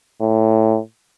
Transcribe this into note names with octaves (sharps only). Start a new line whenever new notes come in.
A2